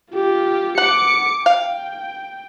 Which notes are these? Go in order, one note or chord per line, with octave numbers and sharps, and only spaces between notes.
F4 G4
F#5 D6 C#7
F5 G5